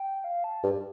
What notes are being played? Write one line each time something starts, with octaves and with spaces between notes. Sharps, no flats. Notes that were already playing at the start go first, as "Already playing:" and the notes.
Already playing: G5
F5
A5
G2